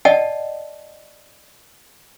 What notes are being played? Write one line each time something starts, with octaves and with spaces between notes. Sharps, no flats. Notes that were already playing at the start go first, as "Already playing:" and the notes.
D5 D#5 F#5 A5